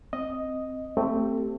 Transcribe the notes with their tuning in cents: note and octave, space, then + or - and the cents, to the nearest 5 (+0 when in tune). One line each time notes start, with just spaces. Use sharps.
C4 +0 D#5 +0
A3 +25 C4 +0 G4 +0